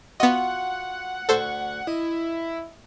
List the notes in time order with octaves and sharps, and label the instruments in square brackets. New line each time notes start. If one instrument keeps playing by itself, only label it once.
[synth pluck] B3 D#5 [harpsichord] F4 F#4 [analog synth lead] F#5
[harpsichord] D2 C#6 [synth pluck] A4 C5
[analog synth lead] E4 [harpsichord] D#5